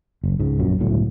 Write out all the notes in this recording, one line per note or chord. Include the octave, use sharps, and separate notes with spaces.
F#1
C#2 G#2
A#1 F#2 A#2 F#3
G1 C#2 A2 F#3